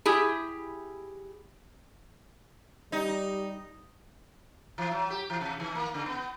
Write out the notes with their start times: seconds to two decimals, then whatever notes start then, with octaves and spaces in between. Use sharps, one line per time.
0.05 E4 G4 G#4
2.92 G3 D#4
4.78 E3
4.91 F#3
5.10 G4
5.30 E3
5.41 C3
5.60 D#3
5.75 A#3
5.94 C#3
6.06 B3